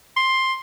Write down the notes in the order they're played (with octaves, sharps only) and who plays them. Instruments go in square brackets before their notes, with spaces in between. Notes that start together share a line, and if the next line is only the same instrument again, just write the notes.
[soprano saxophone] C6